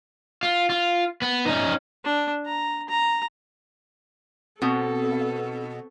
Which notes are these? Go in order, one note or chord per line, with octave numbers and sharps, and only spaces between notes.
F4
F4
B3
C#4 D#4
D4
A#5
A#5
B2 B3 C4 A4